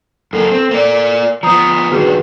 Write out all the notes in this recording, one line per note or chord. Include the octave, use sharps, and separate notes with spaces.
F#2 A#3 A4
C4
A#3 D5
F3 B3 A#5 D#6
G2 D#3 F#4 G#4 B4